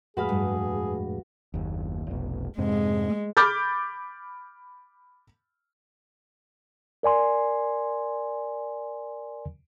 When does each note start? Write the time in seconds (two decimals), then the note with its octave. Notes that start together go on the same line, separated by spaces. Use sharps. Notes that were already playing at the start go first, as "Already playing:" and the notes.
0.17 F2 A2 G#3 F#4 G#4 B4 F5
0.29 G2
1.54 F#1 D#2
2.07 F1 B1
2.58 F2 G#2 C3 G#3
3.37 B5 D6 F6 G6 A6
7.03 A#4 D5 G#5 C6